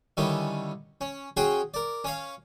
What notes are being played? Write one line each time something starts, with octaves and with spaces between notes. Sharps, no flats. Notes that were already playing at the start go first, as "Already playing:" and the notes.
D3 D#3 G3 C#4 E4
C#4
C#4 F#4 G#4 G5 C6
A#4 D5
C#4 C#5 F5